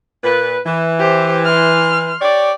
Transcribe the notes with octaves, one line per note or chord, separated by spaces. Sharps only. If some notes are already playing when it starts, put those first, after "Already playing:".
A#2 B4
E3
G4 C5
C6 F6
G4 C#5 D5